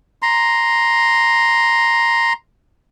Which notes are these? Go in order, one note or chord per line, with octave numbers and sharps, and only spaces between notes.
A#5 C6